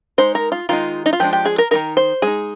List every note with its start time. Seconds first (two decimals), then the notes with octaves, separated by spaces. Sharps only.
0.18 G#3 D#4 C5
0.35 A#4
0.52 F4
0.69 D#3 G#3 D#4 F4
1.06 D#4
1.13 F4
1.20 F3 G#3 D4 G4
1.33 G4
1.45 G#4
1.58 A#4
1.71 D#3 A#3 D#4 A#4
1.97 C5
2.22 G#3 D#4 G#4